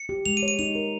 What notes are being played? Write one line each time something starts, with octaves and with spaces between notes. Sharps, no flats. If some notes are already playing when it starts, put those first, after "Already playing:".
Already playing: C#7
G4
G#3 F7
D#7
C#5
D#7
D#4 F7
A#4